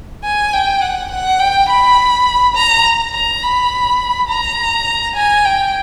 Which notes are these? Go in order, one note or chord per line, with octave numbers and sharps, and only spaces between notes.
G#5
G5
F#5
F#5
G5
B5
A#5
A#5
B5
A#5
G#5
G5